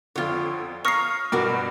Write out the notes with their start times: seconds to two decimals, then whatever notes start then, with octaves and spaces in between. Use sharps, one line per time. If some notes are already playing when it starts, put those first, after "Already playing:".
0.16 F2 D3 F4 C#5
0.85 C#5 F5 A#5 C#6 D#6 F6 A#6 C7
1.32 G2 B2 F#4 A#4 D6